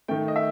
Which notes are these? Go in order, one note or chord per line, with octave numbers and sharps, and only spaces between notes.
D#3 A3 G5
D#5
E5